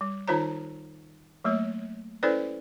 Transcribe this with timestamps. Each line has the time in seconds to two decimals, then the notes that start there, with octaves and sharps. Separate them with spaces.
0.01 G3
0.28 D#3 D#4 F4 C5 C#5 A#5
1.44 F#3 A3 A#3 C#5
2.23 C#4 E4 A4 B4 C5 D5